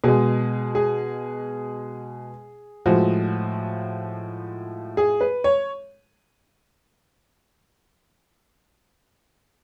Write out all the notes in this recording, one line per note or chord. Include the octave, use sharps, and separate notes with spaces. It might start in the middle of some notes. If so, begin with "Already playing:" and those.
B2 G#3 G#4
G#4
A2 F3 G#3 F#4
G#4
B4
C#5